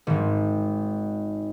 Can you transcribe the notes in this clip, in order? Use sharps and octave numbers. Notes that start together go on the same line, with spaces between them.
G#1 G#2 D#3